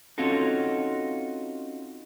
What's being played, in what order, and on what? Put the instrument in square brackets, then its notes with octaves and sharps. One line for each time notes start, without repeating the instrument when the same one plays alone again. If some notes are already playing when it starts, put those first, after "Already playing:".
[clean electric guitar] C4 C#4 D#4 F4 F#4 A4